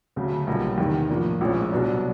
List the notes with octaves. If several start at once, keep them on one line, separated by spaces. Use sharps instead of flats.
D2 C#3 F#3
B1 A#2 G3 A#3
E2 C3 D#3
A2 F3 A#3 D4
A#1 A2 F3 G#3 C#4
C2 B2 F#3 B3 D4